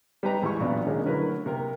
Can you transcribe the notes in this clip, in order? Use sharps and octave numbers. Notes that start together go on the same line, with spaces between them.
G3 D#4 B4 A#5
G#2 E3 G4 C#6
B1 A#2 B3 D4
D#3 F3 G#3 A#3 C#4 D4
D3 F#3 A3 E4 A#4 B4
C3 A#3 A#4